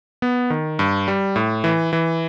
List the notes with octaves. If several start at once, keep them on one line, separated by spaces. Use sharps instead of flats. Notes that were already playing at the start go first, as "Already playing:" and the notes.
B3
D#3
G2
G3
A2
E3
E3